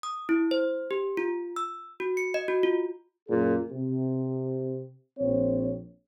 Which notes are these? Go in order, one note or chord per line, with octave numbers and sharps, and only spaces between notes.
D#6
E4
C5
G4
F4
E6
F#4
C#7
D#5
F#4
F4
F#2 A#2 G#4
C3
A#1 C4 C#5